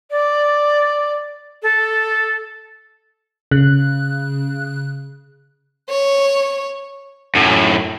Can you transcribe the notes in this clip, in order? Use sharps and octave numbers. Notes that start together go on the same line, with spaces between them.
D5
A4
C#3 F#6
C#5
F#2 A2